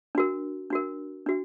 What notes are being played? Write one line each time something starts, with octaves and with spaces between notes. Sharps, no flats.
D4 F#4 A#4
D4 F#4 A#4
D4 F#4